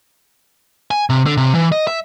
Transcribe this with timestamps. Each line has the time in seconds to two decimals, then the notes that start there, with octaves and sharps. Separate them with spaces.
0.91 G#5
1.10 C3
1.26 D3
1.37 C3
1.54 E3
1.72 D#5
1.87 E5